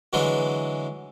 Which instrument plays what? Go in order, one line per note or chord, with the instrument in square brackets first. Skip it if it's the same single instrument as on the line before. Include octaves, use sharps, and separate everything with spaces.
[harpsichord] D3 E3 F#3 G#3